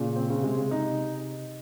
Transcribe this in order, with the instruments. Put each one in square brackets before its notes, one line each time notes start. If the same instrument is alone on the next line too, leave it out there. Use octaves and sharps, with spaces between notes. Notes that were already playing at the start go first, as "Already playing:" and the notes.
Already playing: [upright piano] A#2 [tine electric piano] C#3
[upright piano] C4
[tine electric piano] C#3
[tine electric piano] C3 [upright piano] G#3
[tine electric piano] C#3
[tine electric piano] C3 [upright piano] D#4